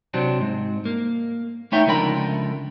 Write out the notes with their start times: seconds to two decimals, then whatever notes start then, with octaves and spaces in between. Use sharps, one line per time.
0.14 C3 F#3 C4 D4
0.40 G#2
0.85 A#3
1.72 A3 B3 D#4 C#5 E5 G5
1.87 C#2 D3 F3 A#4 G5 B5